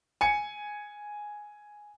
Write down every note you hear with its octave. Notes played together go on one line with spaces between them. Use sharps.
G#5 C#7